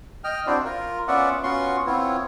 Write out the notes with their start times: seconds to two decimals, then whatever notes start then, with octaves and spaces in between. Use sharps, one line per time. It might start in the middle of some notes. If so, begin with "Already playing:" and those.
0.24 D#5 G5 F6
0.47 C4 D4 E4 F#4 C5 D5
0.65 F4 A#4
1.08 B3 C#4 F4 D5 E5 F#5
1.43 B3 C#4 F4 F#4 C6 C#6
1.87 B3 C4 E4 F4 C#5